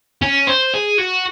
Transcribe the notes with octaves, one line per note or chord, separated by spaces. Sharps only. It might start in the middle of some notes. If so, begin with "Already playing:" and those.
C#4
C5
G#4
F#4